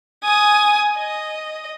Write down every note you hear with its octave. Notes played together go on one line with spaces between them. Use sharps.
G#5 D#6
D#5